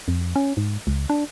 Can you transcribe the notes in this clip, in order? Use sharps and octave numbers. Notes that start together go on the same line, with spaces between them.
F2
C#4
G#2
C#2
D4